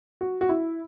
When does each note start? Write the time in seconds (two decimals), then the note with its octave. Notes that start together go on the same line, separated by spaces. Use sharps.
0.21 F#4
0.41 F#4
0.49 E4